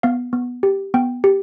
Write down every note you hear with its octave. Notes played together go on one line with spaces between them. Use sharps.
B3 F5
B3
G4
B3 G5
G4